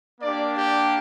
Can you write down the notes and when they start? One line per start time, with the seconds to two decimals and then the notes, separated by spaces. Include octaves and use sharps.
0.21 A#3 D4 G4 D5
0.57 G4